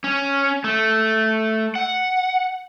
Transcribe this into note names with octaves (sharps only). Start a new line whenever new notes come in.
C#4
A3
F#5